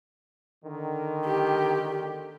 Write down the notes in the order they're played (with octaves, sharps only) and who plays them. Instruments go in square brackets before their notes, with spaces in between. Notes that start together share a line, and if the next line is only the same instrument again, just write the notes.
[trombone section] D3 D#3
[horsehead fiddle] G4